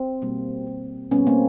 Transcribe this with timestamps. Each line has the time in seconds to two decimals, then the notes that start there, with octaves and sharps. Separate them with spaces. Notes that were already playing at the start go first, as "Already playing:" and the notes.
Already playing: C4
0.22 B2 G3 A#3
0.66 B2 G3 A#3
1.11 B2 G3 A#3 B3 C#4
1.27 A#3 C4